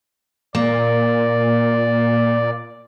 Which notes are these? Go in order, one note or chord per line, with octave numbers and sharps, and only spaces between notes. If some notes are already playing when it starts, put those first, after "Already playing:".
A#2 A#3 D5